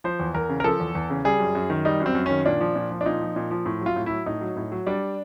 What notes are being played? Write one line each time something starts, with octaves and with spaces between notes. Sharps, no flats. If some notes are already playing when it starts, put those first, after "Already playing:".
F3 C5
E2
E2 A#4
C#3
A#4
F3 A4
E2
E2
C#3
G3 G#4
F#2
F#2
D#3
G3 D#4
F#2
C4
F#2
D#3 C#4
A#2 D4
F3
A#2
F3
D4
A#2 D#4
F3
A#2
F3
A2
F#3 F4
A2
F#3 E4
A2 D#4
F#3
A2
F#3
G3 D4